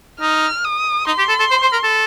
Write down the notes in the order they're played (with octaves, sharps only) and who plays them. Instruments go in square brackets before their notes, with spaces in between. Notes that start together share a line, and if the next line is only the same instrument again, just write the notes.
[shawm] D#4 [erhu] F6
[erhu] D#6
[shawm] D#4 [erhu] C6
[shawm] G4
A4
A4
C5
C5
A#4
A4